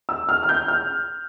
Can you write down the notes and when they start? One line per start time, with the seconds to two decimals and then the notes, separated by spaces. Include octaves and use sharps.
0.09 E6
0.29 F6
0.43 F6
0.49 G6
0.68 F6